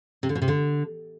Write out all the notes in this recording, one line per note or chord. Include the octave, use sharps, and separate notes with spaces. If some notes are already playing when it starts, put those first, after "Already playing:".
C3
D3
B2
C3
D3